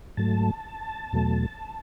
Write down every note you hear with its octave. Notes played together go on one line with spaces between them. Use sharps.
G#2 F#3 A3 A5
E2 B2 F#3 A3